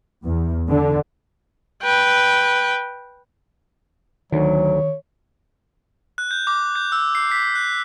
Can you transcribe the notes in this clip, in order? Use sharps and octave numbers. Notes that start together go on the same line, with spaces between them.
E2
D3
B4 G5
D2 D#3 F#3 C#5
F#6
G6
D6
G6
E6
C7
B6
F#6